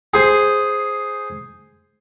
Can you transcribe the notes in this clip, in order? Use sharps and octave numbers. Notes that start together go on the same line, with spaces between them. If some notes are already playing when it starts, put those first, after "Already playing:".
G#4 C5